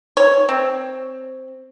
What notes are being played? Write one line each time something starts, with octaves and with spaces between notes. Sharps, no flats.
C#5
C4